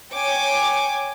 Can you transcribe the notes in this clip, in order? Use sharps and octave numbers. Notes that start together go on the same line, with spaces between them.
C#5 G5 G#5 D6